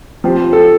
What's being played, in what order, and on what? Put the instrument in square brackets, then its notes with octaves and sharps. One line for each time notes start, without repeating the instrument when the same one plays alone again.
[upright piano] F3 C4 G4 C5
[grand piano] A4